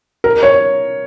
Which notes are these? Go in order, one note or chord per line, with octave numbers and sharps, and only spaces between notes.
A#4
C#5